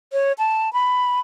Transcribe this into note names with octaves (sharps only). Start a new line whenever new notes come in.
C#5
A5
B5